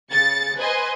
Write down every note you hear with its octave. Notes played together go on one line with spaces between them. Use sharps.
C#3 A6 C#7
B4 C5 D#5 G#5 C6